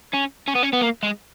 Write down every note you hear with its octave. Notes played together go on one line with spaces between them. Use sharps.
C#4
C#4
B3
C#4
B3
A#3
G#3